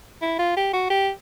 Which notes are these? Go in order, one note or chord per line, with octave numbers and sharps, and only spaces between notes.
E4
F4
G4
F#4
G4